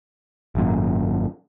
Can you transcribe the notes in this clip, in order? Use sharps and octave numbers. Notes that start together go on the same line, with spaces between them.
G#1 F#2 A#2